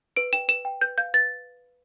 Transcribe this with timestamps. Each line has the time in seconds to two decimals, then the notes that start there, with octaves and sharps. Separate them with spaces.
0.17 B4 D7
0.33 G5 E7
0.49 B4 E7
0.65 G5
0.81 B4 G6
0.98 F5 G6
1.14 B4 A6